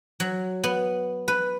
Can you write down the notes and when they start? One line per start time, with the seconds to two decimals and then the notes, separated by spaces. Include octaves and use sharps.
0.20 F#3
0.64 B3
1.28 B4